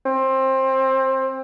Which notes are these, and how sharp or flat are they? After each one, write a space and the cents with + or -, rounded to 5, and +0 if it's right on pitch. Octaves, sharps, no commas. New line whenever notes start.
C4 +20